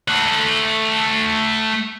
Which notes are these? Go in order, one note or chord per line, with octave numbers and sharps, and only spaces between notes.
A3 F#5